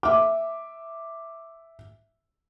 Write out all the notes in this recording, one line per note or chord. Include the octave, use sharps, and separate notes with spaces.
E5 D6